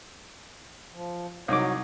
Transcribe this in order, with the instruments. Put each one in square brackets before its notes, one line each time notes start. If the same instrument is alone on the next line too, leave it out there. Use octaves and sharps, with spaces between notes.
[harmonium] F3
[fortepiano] C2 D#4 D6 [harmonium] F#3 C#5